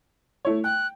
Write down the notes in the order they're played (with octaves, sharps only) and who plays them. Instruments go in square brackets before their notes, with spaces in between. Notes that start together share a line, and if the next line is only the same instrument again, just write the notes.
[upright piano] A3 E4 C#5
[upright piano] G5 [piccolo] F#6